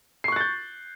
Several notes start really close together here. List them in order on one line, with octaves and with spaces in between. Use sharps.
C7 C#6 F#6 A6 G6